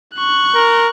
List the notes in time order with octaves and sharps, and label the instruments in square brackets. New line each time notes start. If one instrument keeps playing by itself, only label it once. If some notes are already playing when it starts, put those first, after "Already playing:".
[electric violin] C#6 F#6
[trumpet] A#4